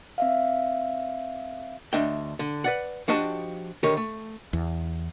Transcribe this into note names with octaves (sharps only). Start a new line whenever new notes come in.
C4 E5 F5
D2 D4 D#5 E5 G5
D3
B4 D5 F#5
F3 D4 F#4 G4 D#5 A5
D3 D#3 G4 A#4 C#5
A3
E2